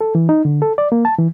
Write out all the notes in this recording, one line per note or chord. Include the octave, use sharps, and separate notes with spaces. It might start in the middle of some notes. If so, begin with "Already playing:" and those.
A4
E3
D#4
D3
A4
D5
A#3
A5
E3